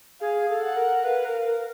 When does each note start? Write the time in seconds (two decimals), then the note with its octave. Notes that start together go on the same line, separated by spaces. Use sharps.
0.21 G#4 F5
0.50 A4
0.63 F#5
0.77 A#4
1.04 B4 F5
1.25 A#4
1.45 A#4